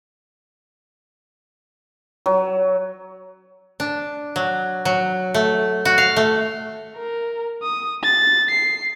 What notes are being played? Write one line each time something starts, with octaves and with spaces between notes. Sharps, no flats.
F#3
D4
F#3
F#3
A3
F#4
F5
A3
A#4
D#6
A6
C7